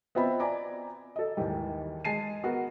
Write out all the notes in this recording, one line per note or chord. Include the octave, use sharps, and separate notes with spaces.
B3 C4 F4 D#5 E5 B5
D5 G#5 A#5 B5 D6
A4 D#5
D#2 G#2 D#3 E3 G3
G#3 G#5 A5 C7 D#7
B3 F#4 A#4 F#5